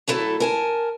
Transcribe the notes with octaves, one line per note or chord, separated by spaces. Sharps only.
F#3 A3 E4 A4
A#4 G#5 A5